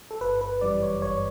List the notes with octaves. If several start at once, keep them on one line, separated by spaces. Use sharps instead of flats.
A4
G1 B4
B4
F#2 E3 G3 D5
C#5
G1 C#5